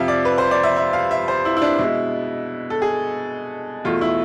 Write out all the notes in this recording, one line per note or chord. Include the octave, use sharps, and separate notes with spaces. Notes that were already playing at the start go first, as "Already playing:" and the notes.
Already playing: F2 C3 F3 E5 F5
D5
B4
C5
D5
E5
E5
F5
E5
C5
E4
E4
D4
B2 G#3 E4
A4
G#4
E2 B2 A3 F4
E4